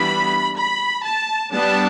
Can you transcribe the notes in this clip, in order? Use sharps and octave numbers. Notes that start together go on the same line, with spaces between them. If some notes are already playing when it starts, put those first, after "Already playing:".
Already playing: E3 G3 B3 D4 B5
B5
A5
G3 B3 D4 A5